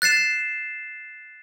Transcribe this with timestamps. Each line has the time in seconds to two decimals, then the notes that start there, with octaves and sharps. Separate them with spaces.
0.02 F#6 A6 C7 E7